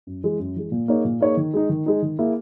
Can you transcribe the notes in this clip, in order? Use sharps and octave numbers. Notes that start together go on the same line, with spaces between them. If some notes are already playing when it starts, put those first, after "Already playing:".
F#2
E3 G#3
F#2
E3 G#3
A#2
A#3 D#4 G#4 C#5
A#2
A#3 D#4 G#4 C#5
D#3
G#3 D#4
D#3
G#3 D#4
D#3
A#3 E4 G#4